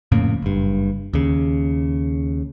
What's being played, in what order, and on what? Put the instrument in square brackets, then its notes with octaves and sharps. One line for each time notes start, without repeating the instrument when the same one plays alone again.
[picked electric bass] F2 A2 C#3 A#3
F#1 G2
D#2 C#3